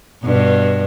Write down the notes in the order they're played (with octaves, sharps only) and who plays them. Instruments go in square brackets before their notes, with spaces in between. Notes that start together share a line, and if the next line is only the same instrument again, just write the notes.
[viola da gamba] G2 B2